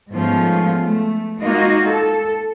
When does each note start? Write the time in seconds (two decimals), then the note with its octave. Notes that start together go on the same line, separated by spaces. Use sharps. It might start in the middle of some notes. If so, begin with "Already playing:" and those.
0.12 G#2 F3 A3 B3 C#4 F4
0.83 A3
1.39 G#3 A#3 D#4 F4 F#4 D#5
1.85 A4